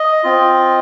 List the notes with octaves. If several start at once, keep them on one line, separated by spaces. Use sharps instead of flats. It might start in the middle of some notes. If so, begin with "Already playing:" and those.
Already playing: D#5
C4 F4